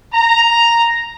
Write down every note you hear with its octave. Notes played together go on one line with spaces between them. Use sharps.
A#5